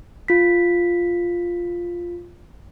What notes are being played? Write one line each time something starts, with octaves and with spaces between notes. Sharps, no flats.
F4 B6